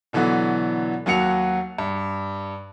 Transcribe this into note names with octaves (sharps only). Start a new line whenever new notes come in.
B2 D3 E3 F#3 B3
D#2 F#3 F#4 C#7 F7
G2